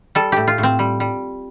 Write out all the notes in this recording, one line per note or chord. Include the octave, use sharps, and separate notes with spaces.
G3 A4
A2 G4
F4
A2
C4
G3
G3